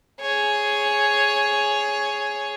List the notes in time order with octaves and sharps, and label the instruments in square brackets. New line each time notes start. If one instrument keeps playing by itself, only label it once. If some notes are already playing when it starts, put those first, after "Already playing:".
[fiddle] G#4 C#5